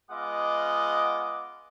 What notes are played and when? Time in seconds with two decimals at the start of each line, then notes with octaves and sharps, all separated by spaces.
0.11 G#3 B3 F4 D#5 F#5 D6